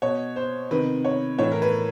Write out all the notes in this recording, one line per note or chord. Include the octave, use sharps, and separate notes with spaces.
B2 C#5
C5
C3 D#3 B4
C#5
A2 E3 C#5
A#4
B4